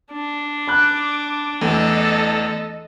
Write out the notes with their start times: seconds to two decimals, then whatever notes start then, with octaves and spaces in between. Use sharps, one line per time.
0.13 D4
0.68 B5 D6 F#6
1.61 E2 A3 A4 D#5